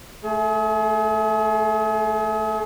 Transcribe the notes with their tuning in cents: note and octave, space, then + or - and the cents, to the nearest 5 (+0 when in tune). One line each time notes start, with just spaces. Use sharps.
A3 +0 G#4 +40